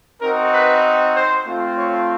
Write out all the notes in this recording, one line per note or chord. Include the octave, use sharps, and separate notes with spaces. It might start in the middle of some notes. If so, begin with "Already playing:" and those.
C4 D#4 F#4 A#4
B4
C5
A3 C4 F4
C#5